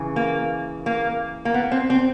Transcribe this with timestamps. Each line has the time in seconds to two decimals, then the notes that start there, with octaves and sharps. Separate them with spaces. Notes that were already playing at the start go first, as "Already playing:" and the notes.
Already playing: C#3 E3
0.16 A#3
0.86 A#3
1.45 A#3
1.54 B3
1.72 C4
1.90 C4